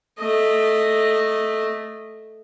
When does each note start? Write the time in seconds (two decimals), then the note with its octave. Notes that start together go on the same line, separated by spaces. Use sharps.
0.20 A3 D#5